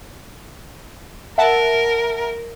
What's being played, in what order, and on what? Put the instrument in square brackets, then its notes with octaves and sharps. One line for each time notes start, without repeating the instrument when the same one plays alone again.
[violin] A#4 [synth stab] E5 F#5 A5